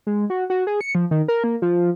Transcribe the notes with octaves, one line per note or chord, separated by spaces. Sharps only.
G#3
F#4
F#4
G#4
C#7
F3
D#3
A#4
A#3
F3